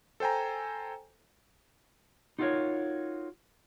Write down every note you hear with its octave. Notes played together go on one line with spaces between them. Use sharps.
A4 C5 G5 G#5 A#5
D#4 F4 F#4 G#4 A#4 C#5